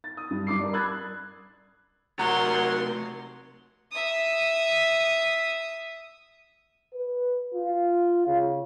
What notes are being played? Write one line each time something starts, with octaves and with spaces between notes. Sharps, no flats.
A6
D#6
G2
G2 D6 C7
A#4 D5
B5 D#6 E6 F#6 G#6 A6
C3 F#3 A3 A#4 F#5 A#5 C6
E5 D#6
B4
F4
C#3